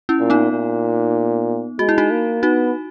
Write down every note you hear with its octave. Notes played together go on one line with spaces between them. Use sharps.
C#4 E4
A#2
B3 D#4
A#2
G#3 F#4
E4
D#4 F#4
A#3
B3 D#4 F#4